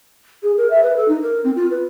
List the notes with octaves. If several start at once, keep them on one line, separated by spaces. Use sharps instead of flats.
G#4
A#4
E5
B4
A4
D#4
A#4
C4
F4
B4